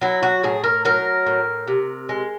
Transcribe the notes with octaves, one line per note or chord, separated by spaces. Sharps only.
F#3 E4
F#4
A2 G#4
A#4
F#3 A#4
A2
C3
G#3